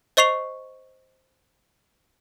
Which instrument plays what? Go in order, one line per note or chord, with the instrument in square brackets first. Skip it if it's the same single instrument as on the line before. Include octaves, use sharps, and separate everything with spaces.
[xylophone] C5 D#5 C#6 C7 F7